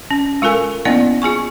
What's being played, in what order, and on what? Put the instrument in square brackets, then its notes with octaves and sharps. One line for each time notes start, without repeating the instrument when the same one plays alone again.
[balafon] C#4
G#3 F4 A4 A#4 G#5
A#3 B3 C#4 E4 D5 D#5
F4 G#4 G#5 C#6